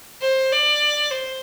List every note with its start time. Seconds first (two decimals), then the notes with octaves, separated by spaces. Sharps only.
0.21 C5
0.52 D5
1.11 C5